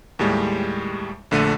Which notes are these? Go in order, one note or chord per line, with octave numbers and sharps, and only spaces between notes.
D#2 A2 G3 G#3
A#1 D3 A3 D#7